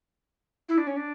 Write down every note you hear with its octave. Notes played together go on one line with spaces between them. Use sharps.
E4
D4
C#4
D4